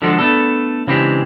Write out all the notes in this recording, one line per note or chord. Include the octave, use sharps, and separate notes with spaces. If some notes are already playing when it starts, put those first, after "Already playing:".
D3 F3 G#3 D4 F#4 A4
A3 B3 D4 A4
C#3 E3 G#3 C4 D4 G4